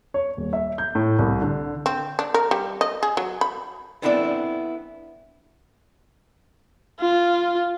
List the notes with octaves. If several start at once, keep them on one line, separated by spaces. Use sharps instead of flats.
C#5
D#1
E5
G6
A2
C2
D3
C4
D4
A#4
G3
D#5
G#4
F#3
B5
B3 C4 D4 E4 A4 D5
F4